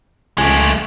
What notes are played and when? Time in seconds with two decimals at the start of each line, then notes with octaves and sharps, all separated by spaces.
0.38 C#2 G#3 A3